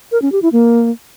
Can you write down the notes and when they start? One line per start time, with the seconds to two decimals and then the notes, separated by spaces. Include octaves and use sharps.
0.12 A#4
0.22 C#4
0.32 G4
0.42 E4
0.52 A#3